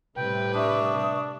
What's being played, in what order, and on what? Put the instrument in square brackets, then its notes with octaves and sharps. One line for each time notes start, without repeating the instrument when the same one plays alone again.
[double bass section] A2 C3 G3 [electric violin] B4 [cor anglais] G5
[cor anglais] D4 [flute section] E5 C#6 D#6